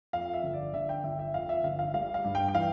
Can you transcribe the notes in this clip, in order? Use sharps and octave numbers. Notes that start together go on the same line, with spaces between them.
F2 F5
E5
G1
D5
D3 E5
G5
G1 E5
E5
F2 F5
E5
G1 F5
F5
G3 F5
F5
G2
G5
G5
E3 F5